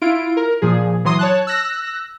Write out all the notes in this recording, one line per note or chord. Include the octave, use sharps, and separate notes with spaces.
E4 F4 D7
A#4
A#2 F3 G#4
E3 F#3 C6 D#6
C#5 A5 F#6
E6 F#6 A#6